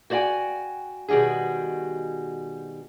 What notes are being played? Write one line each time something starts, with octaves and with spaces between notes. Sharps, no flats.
F#4 C5 D5 F5 G5 G#5
B2 D#3 G3 F#4 G#4